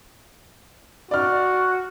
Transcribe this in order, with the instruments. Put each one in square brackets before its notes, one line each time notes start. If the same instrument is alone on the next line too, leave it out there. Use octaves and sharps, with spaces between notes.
[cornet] F#4 [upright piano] D5 F6